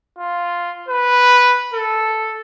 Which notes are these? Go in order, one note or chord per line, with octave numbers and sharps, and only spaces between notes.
F4
B4
A4